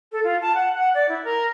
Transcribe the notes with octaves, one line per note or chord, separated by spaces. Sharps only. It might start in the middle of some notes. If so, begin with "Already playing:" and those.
A4
F4
A5
F#5
F#5
D5
E4
A#4